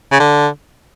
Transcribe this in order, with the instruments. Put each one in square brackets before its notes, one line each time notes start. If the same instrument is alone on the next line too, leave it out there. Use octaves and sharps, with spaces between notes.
[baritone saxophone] C#3
D3